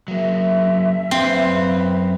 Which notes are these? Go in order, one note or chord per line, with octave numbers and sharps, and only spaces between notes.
F#3 A#3 E5
F#2 C4 B4 F5